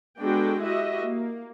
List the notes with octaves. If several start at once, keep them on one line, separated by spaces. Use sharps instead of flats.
G#3 B3 D4 F#4 A4 G5
E4 F#4 G4 D#5 E5
A#3